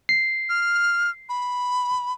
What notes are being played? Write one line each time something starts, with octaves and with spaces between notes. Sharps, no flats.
C7
F6
B5